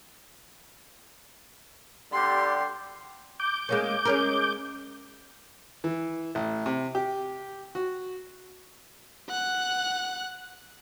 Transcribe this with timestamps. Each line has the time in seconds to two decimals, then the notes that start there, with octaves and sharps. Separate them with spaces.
2.13 D3 G3 G4 C6
3.40 D6 G6
3.69 G#3 A#3 C#4
4.05 G#3 C#4 A#4
5.84 E3
6.35 A1
6.66 C3
6.95 G4
7.75 F#4
9.29 F#5 F#6